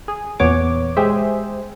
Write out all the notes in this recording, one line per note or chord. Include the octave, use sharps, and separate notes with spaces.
G#4
E2 A#2 B3 C#5 D6
G#3 G4 G#4 C5 E5